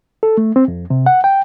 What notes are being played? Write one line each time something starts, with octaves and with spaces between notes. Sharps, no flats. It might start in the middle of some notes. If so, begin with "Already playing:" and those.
A4
A3
C4
F2
C3
F#5
G5